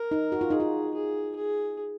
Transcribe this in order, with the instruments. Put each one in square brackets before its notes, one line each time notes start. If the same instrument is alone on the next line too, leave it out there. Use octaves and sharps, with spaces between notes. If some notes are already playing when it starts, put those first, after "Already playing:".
Already playing: [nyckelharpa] A#4
[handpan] D#4
F#4
F4
[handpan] D#4 [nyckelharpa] G#4
[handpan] F4
[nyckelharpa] G#4
G#4